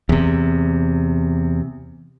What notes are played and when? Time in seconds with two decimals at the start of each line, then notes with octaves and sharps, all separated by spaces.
0.09 E2 C3